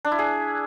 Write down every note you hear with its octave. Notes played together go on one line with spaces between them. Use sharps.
D4
E4
G#4